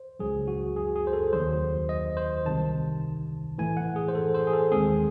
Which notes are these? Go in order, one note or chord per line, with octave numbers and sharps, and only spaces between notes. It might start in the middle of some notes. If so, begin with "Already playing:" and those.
Already playing: C5
C#2 C#3 F#3 G#4
F#4
G#4
G#4
C5
A4
D#2 D#3 F#3 C5
D#5
C5
C2 C3 D#3 A5
A2 E3 A3 G#5
F#5
G#4
C5
A4
C5
G#4
A4
D#2 D#3 G#3 C4 G#4